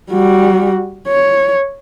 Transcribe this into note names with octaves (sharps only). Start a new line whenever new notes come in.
G3 F#4
C#5